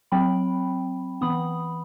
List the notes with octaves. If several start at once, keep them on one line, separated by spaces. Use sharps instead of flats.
F#3 C4 G5 B5
E3 B3 B5 D#6